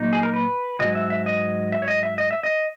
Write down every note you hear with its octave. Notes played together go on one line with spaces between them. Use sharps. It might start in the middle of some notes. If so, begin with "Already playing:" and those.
Already playing: A#2 F#3 A#3 D#4
G#4
A#4
B4
G#2 D#3 F#3 D#5
E5
E5
D#5
E5
C#5
D#5
E5
D#5
E5
D#5